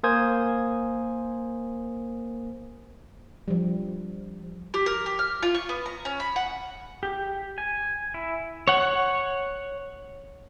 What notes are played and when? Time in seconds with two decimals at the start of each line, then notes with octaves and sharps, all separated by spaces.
0.03 A#3 A#4 C5 G#5 D#6 G#6
3.48 F3 G3
4.74 G4
4.86 A#4
5.06 G4
5.19 F6
5.42 F4
5.54 C#6
5.69 B3
5.86 A#5
6.05 C#4
6.20 B5
6.36 F#5
7.03 G4
7.58 G#5
8.14 E4
8.68 C#5 F#5